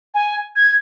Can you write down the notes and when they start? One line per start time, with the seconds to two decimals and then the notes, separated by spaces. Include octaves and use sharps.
0.14 G#5
0.56 G#6